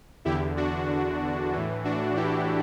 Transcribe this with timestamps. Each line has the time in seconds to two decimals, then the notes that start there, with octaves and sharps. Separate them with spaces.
0.25 E2 D3 E4 G4
0.57 D4 F#4
1.53 A2 E3
1.84 D4 F#4
2.16 E4 G4